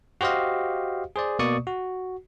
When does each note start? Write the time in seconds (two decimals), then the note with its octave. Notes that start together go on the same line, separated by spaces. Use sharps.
0.21 F#4 G4 C5 D#5 F5
1.16 G#4 C5 D5
1.39 B2 A#3 D5 C#6 D#6
1.67 F#4